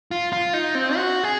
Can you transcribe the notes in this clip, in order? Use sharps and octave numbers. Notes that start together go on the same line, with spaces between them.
F4
F4
D#4
C4
F#4
G#4